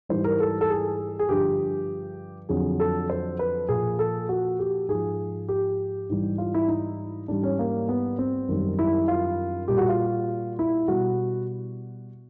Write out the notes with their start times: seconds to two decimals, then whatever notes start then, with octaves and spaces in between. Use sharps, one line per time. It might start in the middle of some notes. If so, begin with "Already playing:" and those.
0.09 G#2 E3 G3 C5
0.24 A#4
0.40 A4
0.61 A4
0.70 G#4
1.19 G#4
1.29 G2 D3 F3 G4
2.49 F2 D3 F#3 G#4
2.80 A4
3.10 C5
3.39 B4
3.69 A#2 F3 G#4
3.99 A4
4.29 F#4
4.59 G4
4.88 G#2 F3 G#4
5.49 G4
6.09 G#2 E3 G3
6.38 F4
6.54 E4
6.68 D#4
7.28 G#2 E3 G3 D4
7.43 C#4
7.59 A#3
7.89 B3
8.19 C4
8.48 F#2 D#3 G3
8.79 E4
9.08 F4
9.68 A#2 G3 G4
9.78 F#4
9.89 F4
10.59 E4
10.88 B2 G3 F#4